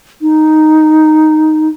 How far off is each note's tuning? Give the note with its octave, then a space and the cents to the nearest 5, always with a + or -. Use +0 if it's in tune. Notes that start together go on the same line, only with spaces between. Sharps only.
D#4 +0